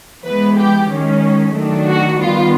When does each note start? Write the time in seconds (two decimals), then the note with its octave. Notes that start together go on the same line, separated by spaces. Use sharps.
0.25 E3 G#3 B3 B4
0.58 G4
0.90 D#3 G#3 C#4
1.54 D#3 F#3 A3 D4
1.87 F#4
2.20 D#3 G3 B3 F4